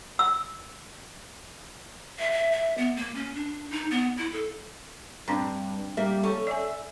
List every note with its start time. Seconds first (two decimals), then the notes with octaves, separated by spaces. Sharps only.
0.19 E6
2.19 E5
2.32 E5
2.52 E5
2.78 B3
2.97 A#3
3.15 C#4
3.35 D4
3.71 D#4
3.91 B3
4.18 E4
4.32 A4
5.28 G2 C4 D4 A#5
5.97 G3 A#3 E5
6.23 C#4 A4
6.47 D5 E5 G#5